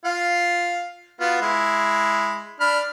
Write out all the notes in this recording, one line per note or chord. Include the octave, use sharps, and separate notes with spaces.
F4 F5
B3 F4 F#4
G#3 E4 B5
D4 B5 F6